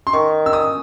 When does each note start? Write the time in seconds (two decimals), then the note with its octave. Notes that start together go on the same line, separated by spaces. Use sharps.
0.07 C6
0.13 D#3 C#6
0.46 E6
0.53 D#6